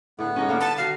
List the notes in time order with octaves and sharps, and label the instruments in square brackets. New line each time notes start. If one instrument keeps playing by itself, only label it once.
[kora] A2 D3 G#4 [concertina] B3
[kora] G#2 G3 [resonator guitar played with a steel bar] C#4 D#4 G#4
[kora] D3 G4 [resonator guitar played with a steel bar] A#3 C#4 F5
[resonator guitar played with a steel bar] B4 [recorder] A5
[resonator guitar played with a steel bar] D#3 F#4 [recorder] F5